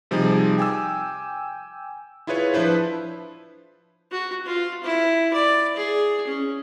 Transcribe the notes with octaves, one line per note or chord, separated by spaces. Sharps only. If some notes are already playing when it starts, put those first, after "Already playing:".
C3 F3 G3 D#4 G#4
G5 G#5 D6 E6
E4 F4 G#4 B4 C#5
F3 D4 E4 B4 C5
F#4
F4
E4
D5
G#4
C#4